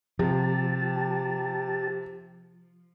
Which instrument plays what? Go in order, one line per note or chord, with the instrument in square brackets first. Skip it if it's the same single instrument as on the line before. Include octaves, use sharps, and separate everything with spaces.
[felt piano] C3 [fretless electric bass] F3 [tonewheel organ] G4 A5